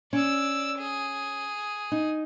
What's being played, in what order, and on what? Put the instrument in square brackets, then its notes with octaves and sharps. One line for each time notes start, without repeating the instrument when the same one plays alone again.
[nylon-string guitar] C#4 [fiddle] D5 E6
[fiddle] G#4
[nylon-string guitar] D#4